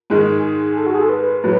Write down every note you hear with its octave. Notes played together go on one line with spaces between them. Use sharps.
G#2 D#3 G#3 G#4
G#4
A4
F#4
G#4
A4
B4
B4
A2 F#3 B4